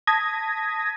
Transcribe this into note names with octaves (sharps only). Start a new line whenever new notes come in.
A5 D#6 G#6 A#6 B6